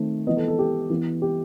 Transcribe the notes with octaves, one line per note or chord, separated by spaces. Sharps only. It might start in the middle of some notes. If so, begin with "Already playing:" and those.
Already playing: D#3 A3 C4
E3 B3 D#5
A4
A4
G4
E3 B3
G4